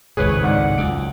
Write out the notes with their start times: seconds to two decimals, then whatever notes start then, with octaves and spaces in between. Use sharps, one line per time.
0.17 G#1 C#2 A2 G#4 B4 C#5
0.43 G#2 D5 F#5
0.78 C#2 F#2 D7